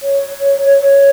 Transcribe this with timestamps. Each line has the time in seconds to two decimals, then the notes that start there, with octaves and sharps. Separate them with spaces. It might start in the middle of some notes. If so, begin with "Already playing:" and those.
0.03 C#5